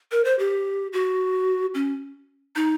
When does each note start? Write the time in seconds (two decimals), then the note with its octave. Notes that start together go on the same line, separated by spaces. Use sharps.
0.12 A#4
0.25 C5
0.39 G4
0.93 F#4
1.74 C#4
2.56 D#4